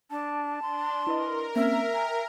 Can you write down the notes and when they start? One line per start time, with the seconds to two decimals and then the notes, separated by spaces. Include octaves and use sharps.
0.11 D4 A5
0.62 D4 C6
1.07 E4 A#4 B4 D#5
1.56 A#3 C4 C#4 E5
1.94 G5 G#5 A#5